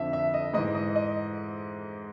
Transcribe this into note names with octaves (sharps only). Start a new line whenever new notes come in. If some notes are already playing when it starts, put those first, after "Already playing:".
Already playing: F2 D3 F3 E5
E5
D#5
G#2 E3 D#5
D#5
D#5